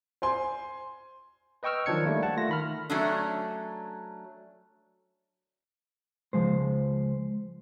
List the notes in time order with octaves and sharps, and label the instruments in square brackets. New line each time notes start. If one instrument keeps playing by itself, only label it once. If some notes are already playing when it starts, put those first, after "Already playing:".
[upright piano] C5 G#5 C6
[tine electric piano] B4 D#5 G5 C#6 E6 F6
D#3 F3 F#3 D4 G#6 C#7
G3 A3 A#3
F#5 A5
A3 F4 A#6
D#3 B5 F6
[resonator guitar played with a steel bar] F#3 A3 C#4 D4
[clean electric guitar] C#2 F3 G#3 C5